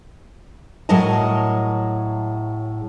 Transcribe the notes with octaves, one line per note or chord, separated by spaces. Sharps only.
A2 F#3 G#4 A#4 D#5 A5